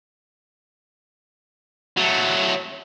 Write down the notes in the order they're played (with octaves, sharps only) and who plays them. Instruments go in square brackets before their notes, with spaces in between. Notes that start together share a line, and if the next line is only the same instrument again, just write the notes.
[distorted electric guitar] F#3 A3